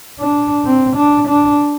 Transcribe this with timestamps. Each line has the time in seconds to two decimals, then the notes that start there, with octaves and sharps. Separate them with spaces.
0.20 D4
0.65 C4
0.97 D4
1.28 D4